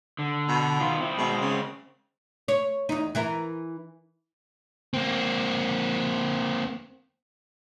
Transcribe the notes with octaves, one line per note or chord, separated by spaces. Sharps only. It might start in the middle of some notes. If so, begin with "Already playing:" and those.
D3
B2
D#3 F4
C4 E4
B2 G#3 C4
C#3
C#5
E2 D#4
E3 E4 A#4
A#3 C4